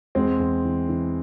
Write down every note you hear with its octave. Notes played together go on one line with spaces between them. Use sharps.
E2 G#3 C4
E2
E3
E3